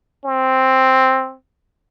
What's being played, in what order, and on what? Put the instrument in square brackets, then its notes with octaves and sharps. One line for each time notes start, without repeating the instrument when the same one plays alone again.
[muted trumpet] C4